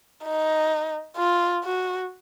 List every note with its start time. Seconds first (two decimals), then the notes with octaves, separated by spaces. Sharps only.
0.24 D#4
1.17 F4
1.64 F#4